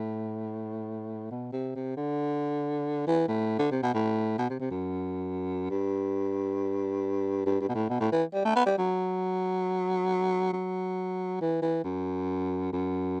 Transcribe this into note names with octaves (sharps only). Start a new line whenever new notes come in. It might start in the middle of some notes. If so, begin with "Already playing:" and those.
Already playing: A2
B2
C3
C3
D3
E3
A2
D3
C3
B2
A2
B2
C3
C3
F#2
G2
G2
G2
B2
A2
B2
A2
E3
G3
A3
B3
G3
F#3
F#3
E3
E3
F#2
F#2